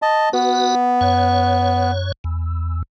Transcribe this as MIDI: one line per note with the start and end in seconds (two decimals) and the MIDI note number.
0.02 0.29 75
0.02 0.29 81
0.33 1.91 59
0.33 0.75 66
0.33 0.75 71
1.01 2.12 42
1.01 2.12 73
2.24 2.83 40